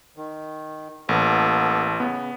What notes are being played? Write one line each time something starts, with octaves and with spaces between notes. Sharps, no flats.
D#3
A1 A#3 B3 A4
C#3 B3